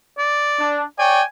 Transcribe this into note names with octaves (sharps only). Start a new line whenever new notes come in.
D5
D4
C#5 D5 G5 G#5